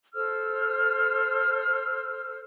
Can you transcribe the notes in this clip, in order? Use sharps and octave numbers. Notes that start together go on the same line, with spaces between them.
A4 C5 E6 F6